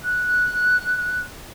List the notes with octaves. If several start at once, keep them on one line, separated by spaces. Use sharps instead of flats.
F#6